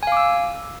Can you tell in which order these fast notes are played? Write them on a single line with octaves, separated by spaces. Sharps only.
G#5 F5 D6 E6